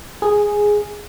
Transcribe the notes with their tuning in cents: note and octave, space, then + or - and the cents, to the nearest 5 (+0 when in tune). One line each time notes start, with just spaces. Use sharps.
G#4 +0